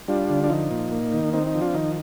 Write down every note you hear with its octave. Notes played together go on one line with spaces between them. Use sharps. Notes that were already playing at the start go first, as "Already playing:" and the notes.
G3 D4 F4
D3
D4
F3 D#4
A#2
A#3
D#3
C4 D#4
D#4
F3
D4 F4
D#3 D#4